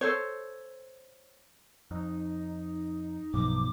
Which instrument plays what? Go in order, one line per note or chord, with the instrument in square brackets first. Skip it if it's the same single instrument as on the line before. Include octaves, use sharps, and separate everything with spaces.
[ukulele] A4 C5 C#5
[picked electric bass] F2 [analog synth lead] D#4
[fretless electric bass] B1 [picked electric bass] G2 B2 F3 [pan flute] D6